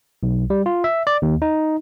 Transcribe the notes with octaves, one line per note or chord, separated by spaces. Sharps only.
B1
G3
F4
E5
D5
D#2
D#4